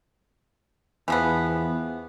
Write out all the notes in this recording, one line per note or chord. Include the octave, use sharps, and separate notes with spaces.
E2 E3 F3 B3